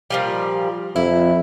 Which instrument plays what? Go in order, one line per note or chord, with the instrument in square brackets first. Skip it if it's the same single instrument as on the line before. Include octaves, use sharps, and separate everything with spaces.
[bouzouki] A#2 F3 G3
[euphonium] F2 [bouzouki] E4